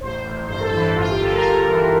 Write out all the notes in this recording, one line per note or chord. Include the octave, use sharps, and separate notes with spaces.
A1 C5
A1
G2 C5
A4
E3 A4
G1 F4
G4
G1 A4
A#4
G1
E3